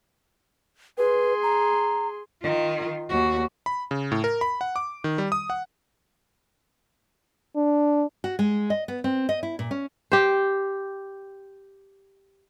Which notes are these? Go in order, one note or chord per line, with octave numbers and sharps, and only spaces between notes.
G#4 B4 C6
A#5
D#3 F4
D#2 F#4
B5
C#3
A2
A#4
B5
F#5
D6
D#3
G3
D#6
F#5
D4
F#4
G#3
D#5
B3
C4
D#5
E4
A#2
C#4
G4 C5